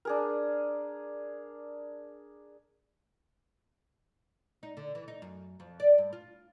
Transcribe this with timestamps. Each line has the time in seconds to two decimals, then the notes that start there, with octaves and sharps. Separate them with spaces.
0.05 D4 G#4 A#4
4.63 D#4
4.77 D3
4.95 E3
5.08 D#4
5.22 F#2
5.60 F2
5.80 D5
5.98 G2
6.13 F4